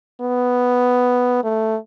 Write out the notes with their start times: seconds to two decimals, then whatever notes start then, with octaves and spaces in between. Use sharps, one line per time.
0.21 B3
1.44 A3